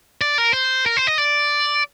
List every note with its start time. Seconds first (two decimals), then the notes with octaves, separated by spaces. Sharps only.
0.21 D5
0.38 A#4
0.53 C5
0.86 A#4
0.97 C5
1.07 D#5
1.18 D5